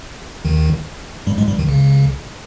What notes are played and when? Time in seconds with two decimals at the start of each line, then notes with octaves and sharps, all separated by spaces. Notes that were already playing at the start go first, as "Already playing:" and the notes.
0.45 D#2 D#3
1.27 G2 G3
1.38 G#2 G#3
1.48 G2 G3
1.59 D#2 D#3
1.68 C#2 C#3